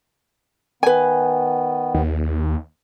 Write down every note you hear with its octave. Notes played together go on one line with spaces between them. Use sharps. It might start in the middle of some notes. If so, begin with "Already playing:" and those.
D#3 B3 B4 G#5
D#2